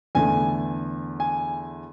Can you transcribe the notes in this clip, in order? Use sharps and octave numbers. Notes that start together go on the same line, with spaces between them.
E2 D3 A3 G#5
G#5